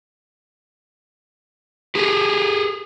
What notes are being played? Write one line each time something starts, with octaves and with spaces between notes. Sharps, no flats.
G4 G#4